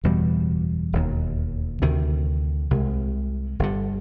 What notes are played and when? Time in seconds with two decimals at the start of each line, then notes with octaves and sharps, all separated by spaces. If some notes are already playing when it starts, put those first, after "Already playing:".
0.04 F#1 E2 B2 G3
0.92 E1 D#2 D#3
1.82 D2 C3 D#3
2.71 C2 C3 D#3 G#3
3.59 G1 G2 D3